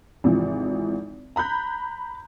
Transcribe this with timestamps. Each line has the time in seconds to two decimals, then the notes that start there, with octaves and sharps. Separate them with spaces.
0.24 G#1 C3 E3 F3
1.36 A#5 B5 F#6 G6